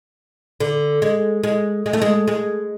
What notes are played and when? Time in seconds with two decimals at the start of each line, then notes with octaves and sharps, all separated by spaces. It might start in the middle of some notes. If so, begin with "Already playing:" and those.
0.60 D3
1.02 G#3
1.43 G#3
1.86 G#3
1.93 A3
2.02 G#3
2.28 G#3